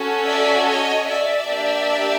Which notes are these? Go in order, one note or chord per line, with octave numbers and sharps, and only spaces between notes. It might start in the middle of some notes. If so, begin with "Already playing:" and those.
Already playing: C#4 F#4 A4
D5 E5
C#5 D#5
D5 E5
A#3 D4 G4